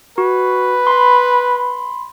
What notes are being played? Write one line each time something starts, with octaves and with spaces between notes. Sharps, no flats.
F#4 B4
B5 C6